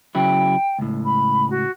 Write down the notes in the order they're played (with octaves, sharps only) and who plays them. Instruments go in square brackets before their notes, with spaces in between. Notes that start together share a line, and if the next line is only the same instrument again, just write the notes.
[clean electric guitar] C#3 F#3 E4 [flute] G5
[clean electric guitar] C#2 A2
[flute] B5
F#4